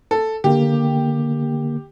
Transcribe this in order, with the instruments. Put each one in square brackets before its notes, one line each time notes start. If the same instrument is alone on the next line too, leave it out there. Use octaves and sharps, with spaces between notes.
[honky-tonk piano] A4
[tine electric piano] D3 A#3 [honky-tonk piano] G4